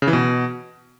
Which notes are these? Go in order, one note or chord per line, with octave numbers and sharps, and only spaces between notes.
C#3
E3
B2